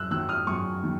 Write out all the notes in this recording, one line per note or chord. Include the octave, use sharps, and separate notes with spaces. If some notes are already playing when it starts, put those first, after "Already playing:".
Already playing: F#2 E6 F#6
D#3 F#3 E6 F#6
D#6 F6
F#2 C#6 D#6
D#3